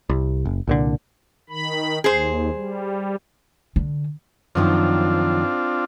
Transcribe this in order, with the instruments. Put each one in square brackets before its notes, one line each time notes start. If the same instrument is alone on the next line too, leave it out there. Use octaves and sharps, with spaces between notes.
[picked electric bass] C2
F#1
C2 A#2 D3
[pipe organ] D#3 B5
[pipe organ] D#2 [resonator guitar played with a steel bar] G#4 C5
[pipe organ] G3
[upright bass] D3
[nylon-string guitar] F#2 D#3 F3 [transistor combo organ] C4 D4 F4